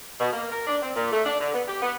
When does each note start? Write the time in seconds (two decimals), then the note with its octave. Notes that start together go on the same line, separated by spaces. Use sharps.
0.20 B2
0.32 A#3
0.51 A#4
0.67 D4
0.82 C4
0.96 A#2
1.11 A3
1.25 D4
1.40 D3
1.54 B3
1.68 G4
1.81 B3